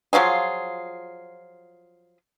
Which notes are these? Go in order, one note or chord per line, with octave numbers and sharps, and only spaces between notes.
F3 F#3 F4 G#4